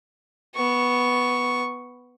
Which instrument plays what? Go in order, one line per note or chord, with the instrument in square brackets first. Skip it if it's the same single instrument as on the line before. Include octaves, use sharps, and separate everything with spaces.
[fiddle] B3 C#6